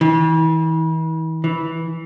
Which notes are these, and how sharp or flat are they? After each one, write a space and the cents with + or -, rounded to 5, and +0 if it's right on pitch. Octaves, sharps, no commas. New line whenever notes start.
E3 -40
E3 -10